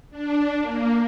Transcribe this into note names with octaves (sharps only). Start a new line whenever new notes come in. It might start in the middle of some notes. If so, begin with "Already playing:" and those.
D4
A#3